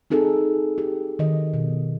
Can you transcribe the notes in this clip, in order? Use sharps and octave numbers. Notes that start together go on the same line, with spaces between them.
C4 D#4 G#4 A4
G4
D#3 D#5
B2